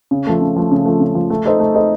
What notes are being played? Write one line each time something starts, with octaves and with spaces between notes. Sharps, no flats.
C#3
F3 A3
C#3
F3 A3
C#3
F3 A3
C#3
F3 A3
A3
D#4 A4 C5 D#5
A3
D#4 A4 C5 D#5